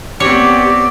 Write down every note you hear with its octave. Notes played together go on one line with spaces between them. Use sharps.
B3 C4 G4 C#5 D5